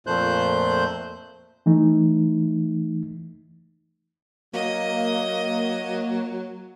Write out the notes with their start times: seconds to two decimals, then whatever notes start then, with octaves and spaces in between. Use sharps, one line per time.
0.07 F2 A#2 A3 C5 F#6 G6
1.66 E3 A3 D#4
4.54 F#3 A#3 D#5